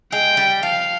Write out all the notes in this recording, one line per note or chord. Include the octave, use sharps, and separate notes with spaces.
G#3 G5
G3
F3 F5